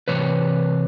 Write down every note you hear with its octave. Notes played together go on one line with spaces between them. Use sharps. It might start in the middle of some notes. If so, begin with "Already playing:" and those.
C3 E3 B4 C#5